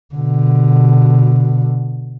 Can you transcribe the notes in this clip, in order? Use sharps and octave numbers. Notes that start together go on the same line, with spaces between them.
B2 D3